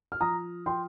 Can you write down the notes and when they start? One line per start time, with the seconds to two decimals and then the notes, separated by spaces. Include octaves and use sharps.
0.12 F6
0.21 F3 A#5 D#6
0.66 F3 G5 C6